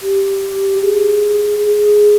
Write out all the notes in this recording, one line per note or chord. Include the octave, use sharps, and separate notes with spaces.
G4
G#4
G#4